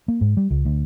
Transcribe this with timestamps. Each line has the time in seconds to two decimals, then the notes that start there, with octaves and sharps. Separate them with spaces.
0.08 A#3
0.21 G#2
0.37 G3
0.51 C#2
0.65 D2